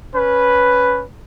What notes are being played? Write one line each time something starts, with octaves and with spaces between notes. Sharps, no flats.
C#4 B4